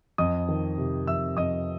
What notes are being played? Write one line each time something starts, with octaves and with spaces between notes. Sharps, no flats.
F2 D#5 D#6
D#3
C3
F2 E5 E6
F2 D#5 D#6